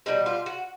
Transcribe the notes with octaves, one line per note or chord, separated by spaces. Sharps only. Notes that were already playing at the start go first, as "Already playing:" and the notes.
B2 G3 D#4
F4
F#4